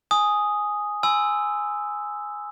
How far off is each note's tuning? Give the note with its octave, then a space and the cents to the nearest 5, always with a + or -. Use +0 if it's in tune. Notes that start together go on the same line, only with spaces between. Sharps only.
G#5 +0 D#6 +0
G#5 +0 C6 -45 E6 +0